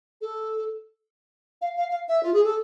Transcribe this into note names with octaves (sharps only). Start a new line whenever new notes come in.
A4
F5
F5
F5
E5
F4
G#4
A4